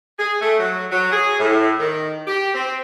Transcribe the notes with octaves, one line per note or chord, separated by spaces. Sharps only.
G#4
A3
F#3
F#3
G#4
A2
D#3
G4
C4